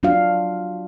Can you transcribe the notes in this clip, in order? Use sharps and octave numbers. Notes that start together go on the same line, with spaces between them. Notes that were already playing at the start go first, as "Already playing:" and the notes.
F#3 D4 F4 F#4 F5